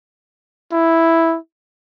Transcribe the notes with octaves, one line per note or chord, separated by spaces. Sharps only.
E4